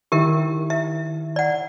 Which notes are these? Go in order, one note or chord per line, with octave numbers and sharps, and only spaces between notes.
D#3 E4 G4 A#4 E5
E5
D5 F#5